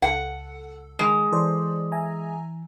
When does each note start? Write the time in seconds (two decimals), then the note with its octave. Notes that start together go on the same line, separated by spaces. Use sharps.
0.02 C#2 A4 F#5
0.99 D#3 G#3
1.32 E3 A4 C5 D5
1.92 E5 G#5 A#5